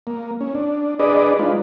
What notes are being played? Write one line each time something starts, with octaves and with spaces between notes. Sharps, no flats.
A#3
C#4
D4
D4 G#4 B4 D5 D#5
G#3 D4 D#4 F4 B4